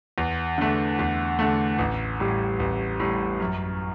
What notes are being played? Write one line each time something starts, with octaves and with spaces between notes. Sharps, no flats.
E2
D3 A3
E2
D3 A3
A1
A2 G3
A1
A2 G3
F#2